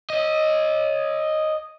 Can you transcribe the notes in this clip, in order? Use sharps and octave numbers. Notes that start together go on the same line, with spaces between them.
C#5 D#5